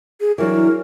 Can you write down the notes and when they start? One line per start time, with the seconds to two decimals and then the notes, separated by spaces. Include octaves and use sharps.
0.21 G#4
0.38 E3 F#3 D4 A#4